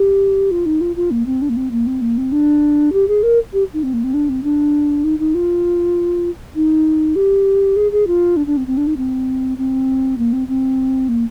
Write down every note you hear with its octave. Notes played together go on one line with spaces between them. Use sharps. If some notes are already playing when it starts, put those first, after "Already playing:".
Already playing: G4
F4
D#4
F4
F4
A#3
C4
D4
A#3
C4
A#3
C4
A#3
C4
D4
G4
G#4
A#4
G4
D#4
C4
A#3
C4
D4
C4
D4
D#4
D#4
F4
D#4
G4
G#4
G#4
F4
D4
D4
C4
C4
D4
D#4
C4
C4
A#3
C4
C4
A#3